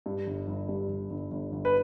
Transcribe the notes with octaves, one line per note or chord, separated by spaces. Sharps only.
G2
G1
G1
G2
G1
G1
G1
G1
B4